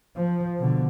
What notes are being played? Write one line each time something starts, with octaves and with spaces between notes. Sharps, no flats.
F3
B2 D3